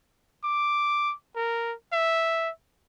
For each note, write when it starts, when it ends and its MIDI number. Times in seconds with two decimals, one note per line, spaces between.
0.44 1.14 86
1.36 1.74 70
1.93 2.50 76